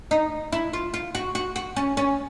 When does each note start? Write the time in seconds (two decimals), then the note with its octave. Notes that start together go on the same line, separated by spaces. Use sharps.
0.11 D#4
0.52 E4
0.73 F4
0.94 F4
1.15 F#4
1.35 F#4
1.56 F#4
1.76 C#4
1.97 C#4